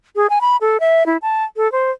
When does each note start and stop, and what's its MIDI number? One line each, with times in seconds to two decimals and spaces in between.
0.16 0.27 68
0.30 0.39 80
0.41 0.57 83
0.61 0.78 69
0.80 1.06 76
1.06 1.17 64
1.22 1.44 81
1.57 1.70 69
1.72 1.91 72